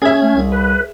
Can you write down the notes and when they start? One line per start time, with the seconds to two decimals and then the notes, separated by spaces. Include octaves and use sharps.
0.02 C#4 G#4 E5 G#6
0.22 A3
0.35 C2
0.52 B4